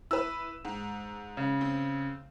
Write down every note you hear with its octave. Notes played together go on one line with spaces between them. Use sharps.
E4 B4 E6
G#2
C#3
C4